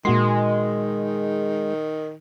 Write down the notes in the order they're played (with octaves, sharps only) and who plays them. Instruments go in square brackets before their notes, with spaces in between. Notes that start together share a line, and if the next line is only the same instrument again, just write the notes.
[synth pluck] A#2 F#4 C6 [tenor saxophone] D#3 [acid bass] G#3